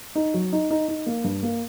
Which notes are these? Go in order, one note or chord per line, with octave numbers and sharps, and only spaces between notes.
D#4
F#3
D#4
D#4
D#4
A#3
G2
A#3